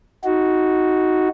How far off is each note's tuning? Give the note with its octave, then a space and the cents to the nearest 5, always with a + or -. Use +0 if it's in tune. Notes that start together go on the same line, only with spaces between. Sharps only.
D#4 +15 F#4 +0